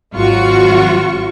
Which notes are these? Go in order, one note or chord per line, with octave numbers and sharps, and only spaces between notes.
G#1 F#3 F4 F#4 C#6